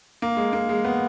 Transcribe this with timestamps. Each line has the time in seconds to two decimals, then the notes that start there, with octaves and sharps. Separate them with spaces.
0.22 A#3
0.37 G#3
0.53 A#3
0.69 G#3
0.84 B3